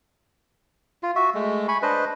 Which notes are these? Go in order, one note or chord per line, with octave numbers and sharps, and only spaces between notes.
F4
F#4 E5
G#3 A3
G#5 B5 C#6
D4 B4 C5 D#5